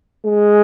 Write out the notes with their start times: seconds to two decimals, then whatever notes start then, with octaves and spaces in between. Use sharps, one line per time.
0.25 G#3